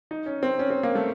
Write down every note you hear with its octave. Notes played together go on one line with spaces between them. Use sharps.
D#4
C#4
C4
C#4
C4
A#3
A3